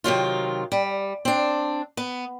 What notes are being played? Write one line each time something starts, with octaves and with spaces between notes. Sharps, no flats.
C3 D#3 F#3 F4
G3
C4 D4
B3